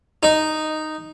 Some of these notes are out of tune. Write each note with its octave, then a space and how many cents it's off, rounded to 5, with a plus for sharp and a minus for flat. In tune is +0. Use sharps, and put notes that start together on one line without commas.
D#4 -5